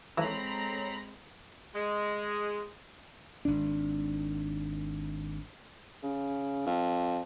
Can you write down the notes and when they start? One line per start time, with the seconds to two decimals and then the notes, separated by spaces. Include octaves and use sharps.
0.18 E3 G#3 C4 A4 C#5 A#5 B5
1.75 G#3
3.45 G#1 D4
6.03 C#3
6.66 F2